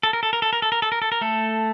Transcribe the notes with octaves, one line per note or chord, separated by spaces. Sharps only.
A4
A#4
A4
A#4
A4
A#4
A4
A#4
A4
A#4
A4
A#4
A3 A4